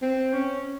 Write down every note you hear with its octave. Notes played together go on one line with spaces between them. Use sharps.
C4
C#4